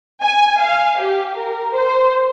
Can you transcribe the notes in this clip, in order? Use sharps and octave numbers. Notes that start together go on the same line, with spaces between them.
G#5
F5
G4
A#4
C5